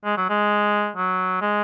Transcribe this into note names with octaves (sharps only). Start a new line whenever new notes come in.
G#3
F#3
G#3
F#3
G#3